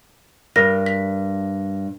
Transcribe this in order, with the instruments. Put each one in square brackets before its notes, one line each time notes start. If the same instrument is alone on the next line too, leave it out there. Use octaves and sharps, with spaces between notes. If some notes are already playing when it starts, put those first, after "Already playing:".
[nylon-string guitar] G2 [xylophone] A#4 A#6
[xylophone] B6